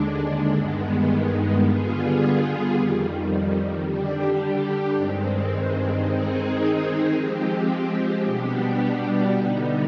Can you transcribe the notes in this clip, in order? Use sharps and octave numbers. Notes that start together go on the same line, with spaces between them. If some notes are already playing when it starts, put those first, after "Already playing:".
Already playing: D#2 D3 G#3 D4
G2 D#3 G#3 B3
D3 G3 B3 F4 G#4
F2 D#3 G3
D3 G3 D4 G4
G2 D#3 G#3 C4
D#3 G#3 C4 D#4 G#4
F3 G#3 C4 G4
B2 G3 B3 D4 G4
D3 G3 B3 D#4